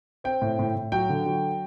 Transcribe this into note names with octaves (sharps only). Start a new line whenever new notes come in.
C4 G5
A2
A2
A2
F#3 G5
D3
F#3